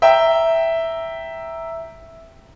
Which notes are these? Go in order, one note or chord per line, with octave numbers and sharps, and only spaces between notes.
E5 G5 A#5